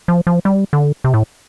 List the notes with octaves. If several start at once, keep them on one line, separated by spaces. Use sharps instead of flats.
F3
F3
G3
D3
C3
A2